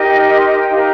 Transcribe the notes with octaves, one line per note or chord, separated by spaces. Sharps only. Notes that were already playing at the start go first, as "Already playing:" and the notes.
Already playing: D#4 G4 A#4 D#5
C6
A#5
G5
D#4 G4 A#4 F5